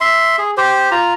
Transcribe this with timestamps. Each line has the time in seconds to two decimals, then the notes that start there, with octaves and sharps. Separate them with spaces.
0.01 E5 C6
0.38 G#4
0.57 G4 C5
0.91 F4 A#5